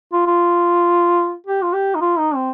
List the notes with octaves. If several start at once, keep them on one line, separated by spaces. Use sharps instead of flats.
F4
F4
G4
F4
G4
D#4
F4
D#4
C4